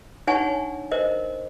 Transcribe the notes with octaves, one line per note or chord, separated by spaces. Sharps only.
D4 D#4 C#5 F#5 G#5 C#6
A#4 C5 D#5